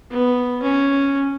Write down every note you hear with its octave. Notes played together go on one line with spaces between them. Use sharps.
B3
C#4